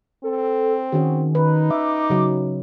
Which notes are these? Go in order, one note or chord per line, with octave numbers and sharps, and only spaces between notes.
C4 A4
D#3 C#4 F#4 G#4
D#4 B4
E5 D6
C#3 F#3